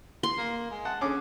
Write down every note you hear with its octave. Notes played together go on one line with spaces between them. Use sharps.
C6
A#3
G#3
F#5 A5
D3 C#4 G#4 D6